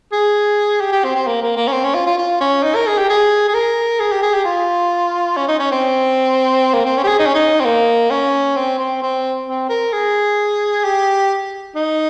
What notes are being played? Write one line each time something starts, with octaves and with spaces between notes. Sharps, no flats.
G#4
G4
G4
C4
C4
A#3
A#3
A#3
C#4
C4
C#4
F4
F4
F4
C#4
D#4
A#4
G#4
G4
G#4
G#4
A#4
G#4
G4
G#4
G4
F4
C#4
D#4
C#4
C4
A#3
C4
C#4
G4
G#4
D#4
C#4
D#4
C4
A#3
C#4
C4
C4
C4
C4
A#4
G#4
G4
D#4